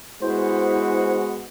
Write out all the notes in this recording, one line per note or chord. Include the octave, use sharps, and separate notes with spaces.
G#3 B3 E4 F#4 C5